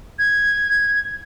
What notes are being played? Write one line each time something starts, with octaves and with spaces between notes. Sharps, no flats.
G#6